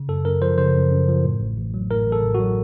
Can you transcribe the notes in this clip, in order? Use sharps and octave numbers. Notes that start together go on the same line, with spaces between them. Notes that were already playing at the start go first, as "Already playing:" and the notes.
Already playing: C#3
F#2 A4
F#2 A#4
F3 C5
C#3 C5
F#2
F#2
F3
A2
A1
A1
F#3
A2 A#4
A1
A4
A1
F#4
F#3